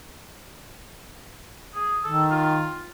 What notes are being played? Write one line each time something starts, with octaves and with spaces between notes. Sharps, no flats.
G#4
D#3 A4
F4